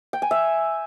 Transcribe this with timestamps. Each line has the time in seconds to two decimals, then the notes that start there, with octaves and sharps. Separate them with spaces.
0.13 G5
0.22 G#5
0.31 E5